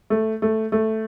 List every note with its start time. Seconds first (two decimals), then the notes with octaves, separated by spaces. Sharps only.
0.10 A3
0.42 A3
0.72 A3